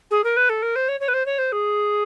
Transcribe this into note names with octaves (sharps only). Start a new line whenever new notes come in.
G#4
A#4
B4
A4
A#4
C5
C#5
C#5
B4
C5
C#5
C5
G#4